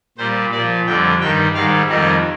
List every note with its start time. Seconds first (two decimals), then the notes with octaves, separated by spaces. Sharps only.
0.18 A#2 G3 C5
0.52 A#2 F3 D5
0.86 F2 D3 G3 G5
1.21 G2 D#3 G3 G5
1.54 G#2 D#3 G3 F5
1.88 F2 D#3 G3 D#5